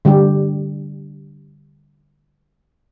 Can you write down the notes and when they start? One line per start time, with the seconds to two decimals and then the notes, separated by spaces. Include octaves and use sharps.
0.05 D3 G3 D4 G4